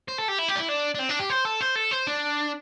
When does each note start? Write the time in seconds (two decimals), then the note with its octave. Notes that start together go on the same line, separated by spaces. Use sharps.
0.08 C5
0.18 A4
0.28 G4
0.38 E4
0.48 G4
0.55 D4
0.59 E4
0.68 D4
0.95 D4
0.99 C4
1.09 D4
1.20 G4
1.30 C5
1.45 A4
1.61 C5
1.76 A4
1.91 C5
2.07 D4